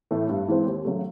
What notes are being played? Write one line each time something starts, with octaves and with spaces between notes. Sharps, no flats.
A2 E3 A3
G2
E3 G#3 C4
D#2
C#3 F#3 A3